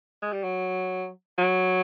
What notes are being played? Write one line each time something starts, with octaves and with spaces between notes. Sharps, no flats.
G#3
G3
F#3
F#3